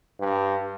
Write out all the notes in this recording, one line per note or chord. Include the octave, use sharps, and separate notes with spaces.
G2